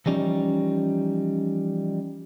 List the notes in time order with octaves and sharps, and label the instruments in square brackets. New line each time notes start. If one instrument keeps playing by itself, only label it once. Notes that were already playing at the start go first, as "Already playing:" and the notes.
[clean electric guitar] E3 F3 G3 C#4 D#4